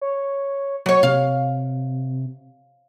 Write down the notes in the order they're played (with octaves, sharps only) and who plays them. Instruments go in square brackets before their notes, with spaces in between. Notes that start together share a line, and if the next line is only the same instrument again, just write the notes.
[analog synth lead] C#5
[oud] F#3 C#5
[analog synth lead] C3 [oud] F5